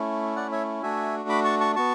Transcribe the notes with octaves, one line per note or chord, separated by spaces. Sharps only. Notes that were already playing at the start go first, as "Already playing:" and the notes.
Already playing: A3 C#4 E4
D5 F#5
C#5 E5
A3 D4 F#4 E5 G#5
B5 D6
A5 C#6
A5 C#6
B3 F#4 A5 C#6